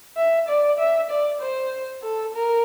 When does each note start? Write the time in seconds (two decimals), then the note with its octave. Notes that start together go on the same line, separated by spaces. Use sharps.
0.17 E5
0.48 D5
0.79 E5
1.10 D5
1.41 C5
2.03 A4
2.34 A#4